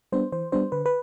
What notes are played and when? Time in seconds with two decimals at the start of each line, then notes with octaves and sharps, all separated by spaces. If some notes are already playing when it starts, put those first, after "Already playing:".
0.12 G3 B3 D4 C5
0.32 E3 C5
0.52 G3 B3 D4 C5
0.72 D3 B4
0.86 B4